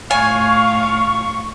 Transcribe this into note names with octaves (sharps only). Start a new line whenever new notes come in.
A2 F4 F5 G#5 C#6